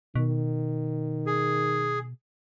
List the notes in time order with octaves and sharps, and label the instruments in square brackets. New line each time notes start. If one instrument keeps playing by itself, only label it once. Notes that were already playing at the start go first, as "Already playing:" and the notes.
[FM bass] B2 [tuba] D#3
[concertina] G#4